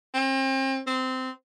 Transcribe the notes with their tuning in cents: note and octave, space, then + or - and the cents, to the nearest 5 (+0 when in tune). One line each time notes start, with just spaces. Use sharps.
C4 +35
C4 -15